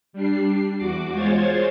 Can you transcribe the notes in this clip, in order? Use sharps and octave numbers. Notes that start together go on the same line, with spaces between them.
G3 D4 C7
E2 F#4 D6
G#3 F4 C5 C#5 G#6 A6